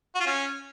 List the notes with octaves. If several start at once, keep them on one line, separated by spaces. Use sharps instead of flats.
F#4
F4
C#4